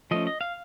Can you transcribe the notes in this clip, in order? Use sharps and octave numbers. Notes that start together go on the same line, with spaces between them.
F3 A3 C#4 D#5
D#5
F5